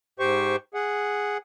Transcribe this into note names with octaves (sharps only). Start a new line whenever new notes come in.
G#2 G4 C5 C#6
G#4 F#5